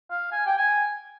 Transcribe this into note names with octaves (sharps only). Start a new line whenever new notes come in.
F5
G#5
G5
G#5